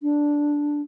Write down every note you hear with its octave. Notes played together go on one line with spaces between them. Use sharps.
D4